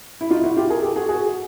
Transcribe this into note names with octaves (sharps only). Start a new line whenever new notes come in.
E4
D#4 F4
E4 F#4
F4 G4
G#4 A#4
G4 A4
F#4 G#4
F#4 G#4